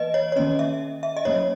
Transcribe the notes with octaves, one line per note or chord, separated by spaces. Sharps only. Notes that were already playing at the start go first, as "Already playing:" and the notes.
Already playing: E3 A#3 B4 D#5
C#5
C#5
D#3 A#3 C#4 D#5
E5
E5
D#5
F#3 A#3 C#4 C#5